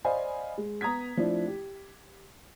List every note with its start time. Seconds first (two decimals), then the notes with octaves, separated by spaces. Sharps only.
0.05 C5 D5 D#5 F5 G#5 B5
0.58 G#3
0.81 B3 A#5 D#6 G#6 B6
1.17 F3 A3 C4 D4 E4
1.47 G4